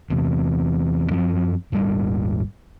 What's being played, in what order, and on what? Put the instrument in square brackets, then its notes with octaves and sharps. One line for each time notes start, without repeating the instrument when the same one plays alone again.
[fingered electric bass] E2 C3
F#2 F3 C4
D#1 G#1 G3